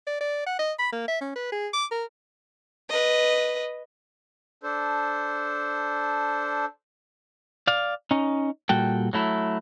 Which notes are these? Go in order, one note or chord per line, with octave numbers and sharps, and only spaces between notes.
D5
D5
F#5
D#5
B5
A#3
E5
C#4
B4
G#4
D6
A#4
B4 D#5
D4 A4 C5
D5 F5
C#4 D#4
A#2 G3 F#4 A4 G5
F#3 A3 E4